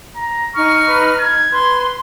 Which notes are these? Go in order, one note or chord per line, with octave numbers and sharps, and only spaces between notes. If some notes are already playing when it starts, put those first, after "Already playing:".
A#5
D#4 C#6 F6
B4
G#6
B4 C6